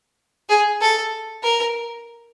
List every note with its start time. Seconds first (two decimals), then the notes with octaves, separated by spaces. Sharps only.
0.49 G#4
0.81 A4
1.43 A#4